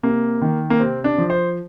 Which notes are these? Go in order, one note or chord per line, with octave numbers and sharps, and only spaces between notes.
C3 A#3
D#3
A#3
C3 C4
D4
F3
C5